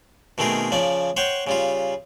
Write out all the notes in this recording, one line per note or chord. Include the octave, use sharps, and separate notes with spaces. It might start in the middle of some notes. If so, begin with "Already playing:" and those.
B2 D#3 A3 C4 G#4 A#4
C#3 F3 D5
C5 C#5 F#5 G5 C#6
C#3 G3 F4